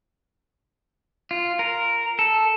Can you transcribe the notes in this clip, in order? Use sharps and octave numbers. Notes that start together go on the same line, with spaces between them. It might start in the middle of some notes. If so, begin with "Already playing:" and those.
F4
A#4
A4